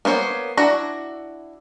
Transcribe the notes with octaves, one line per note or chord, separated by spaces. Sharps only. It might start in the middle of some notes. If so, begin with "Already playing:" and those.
A#3 B3 C5 C#5
D4 E4 F#4 A#5